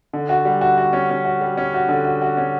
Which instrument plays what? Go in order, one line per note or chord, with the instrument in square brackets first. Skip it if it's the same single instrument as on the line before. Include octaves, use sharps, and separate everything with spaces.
[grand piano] D3
F#4
G3
F#4
F#4
C#4
C#4
F#4
G3
C#4
F#4
D3
F#4
F#4
C#4